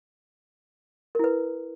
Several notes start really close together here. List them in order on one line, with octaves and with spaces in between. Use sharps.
A#4 E4 B4